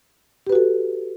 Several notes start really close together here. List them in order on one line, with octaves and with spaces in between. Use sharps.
G4 B4 F#4 A4